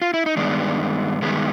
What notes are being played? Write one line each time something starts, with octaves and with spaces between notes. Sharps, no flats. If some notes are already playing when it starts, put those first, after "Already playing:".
F4
E4
D#4
G2 D#3 G#3 B3 D4
G2 D#3 G#3 B3